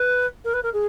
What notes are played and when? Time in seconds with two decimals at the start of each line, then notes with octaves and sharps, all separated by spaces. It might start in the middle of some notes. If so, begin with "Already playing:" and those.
Already playing: B4
0.44 A#4
0.53 B4
0.63 A#4
0.73 G#4